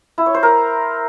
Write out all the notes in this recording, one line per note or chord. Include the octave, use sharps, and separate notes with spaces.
E4
C#5
C5
A#4